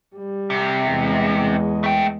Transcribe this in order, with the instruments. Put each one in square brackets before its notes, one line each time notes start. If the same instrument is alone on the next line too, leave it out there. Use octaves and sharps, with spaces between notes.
[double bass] G3
[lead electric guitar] C2 C3
[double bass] E2 G#3
[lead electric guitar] A3 G5